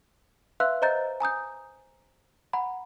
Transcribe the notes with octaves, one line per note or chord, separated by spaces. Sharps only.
B4 E5 F5 C6 E6 F#6
C5 D#5 A#5 G6 A6
G#5 A#5 D#6 G6
F#5 A#5 B5